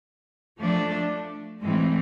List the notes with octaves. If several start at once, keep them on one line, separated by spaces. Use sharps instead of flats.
F3 A3 D4
A2 E3 G#3 C4